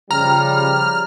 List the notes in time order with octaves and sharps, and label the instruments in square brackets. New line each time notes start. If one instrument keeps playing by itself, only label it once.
[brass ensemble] C#3 F3 G3 [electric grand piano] A#5 [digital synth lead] F6